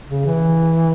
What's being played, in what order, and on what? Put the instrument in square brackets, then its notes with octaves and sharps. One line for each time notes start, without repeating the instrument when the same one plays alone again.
[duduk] C#3
E3